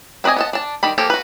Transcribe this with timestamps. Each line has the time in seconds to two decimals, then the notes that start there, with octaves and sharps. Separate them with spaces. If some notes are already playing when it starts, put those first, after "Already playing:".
0.24 C4 B4 D5 D#5 G#5
0.36 B3 D#5 A5
0.53 D4 A5
0.83 D#3 G3 B5
0.98 F3 A#3 G4 A4
1.10 F#4 B4